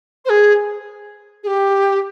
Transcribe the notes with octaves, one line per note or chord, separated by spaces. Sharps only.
C5
G#4
G#4
G4